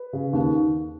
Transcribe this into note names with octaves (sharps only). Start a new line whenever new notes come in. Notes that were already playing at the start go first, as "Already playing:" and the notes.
Already playing: B4
C#3
D#2